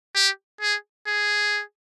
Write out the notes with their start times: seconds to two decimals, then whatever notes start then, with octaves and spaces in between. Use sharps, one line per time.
0.15 G4
0.61 G#4
1.07 G#4